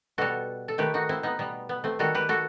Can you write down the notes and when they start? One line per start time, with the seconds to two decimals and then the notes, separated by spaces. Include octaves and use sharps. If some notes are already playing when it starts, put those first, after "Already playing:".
0.18 B2 G3 F#4 A4
0.68 A4
0.78 D#3 A3 G4 B4
0.94 D#4 F#4
1.09 C4 E4
1.23 B3 D#4
1.39 B2 G3 B3
1.69 B3
1.84 A3 C4
1.99 D#3 G3 F#4 A4
2.15 G4 B4
2.29 F#4 A4